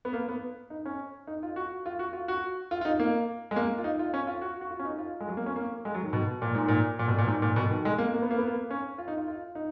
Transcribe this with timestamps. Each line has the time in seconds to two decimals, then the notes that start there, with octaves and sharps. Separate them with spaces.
0.05 B3
0.13 A#3
0.29 B3
0.70 D#4
0.86 C#4
1.27 D#4
1.43 F4
1.56 F#4
1.86 F4
1.99 F#4
2.13 F4
2.28 F#4
2.71 F4
2.81 F4
2.85 D#4
2.99 A#3
3.51 G#3
3.56 A#3
3.78 F4
3.84 D#4
3.99 F4
4.14 C#4
4.27 F4
4.41 F#4
4.61 F#4
4.71 F4
4.79 C#4
4.85 D#4
4.99 F4
5.20 G#3
5.28 F#3
5.37 A#3
5.46 C#4
5.56 A#3
5.85 G#3
5.94 F#3
6.03 D#3
6.13 B2
6.42 A#2
6.55 G#2
6.68 A#2
6.99 A#2
7.08 B2
7.18 A#2
7.27 G#2
7.42 A#2
7.56 B2
7.70 D#3
7.85 G#3
7.98 A#3
8.14 A#3
8.22 B3
8.31 A#3
8.38 B3
8.47 A#3
8.70 C#4
8.98 F4
9.08 D#4
9.18 F4
9.28 F4
9.55 D#4